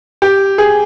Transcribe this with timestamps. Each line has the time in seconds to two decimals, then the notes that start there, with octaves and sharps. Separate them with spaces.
0.22 G4
0.58 G#4